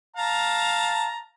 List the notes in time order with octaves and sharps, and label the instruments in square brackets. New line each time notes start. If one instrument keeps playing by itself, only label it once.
[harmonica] F5 A5 A#5